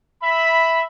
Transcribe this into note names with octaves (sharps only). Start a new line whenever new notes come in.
E5 B5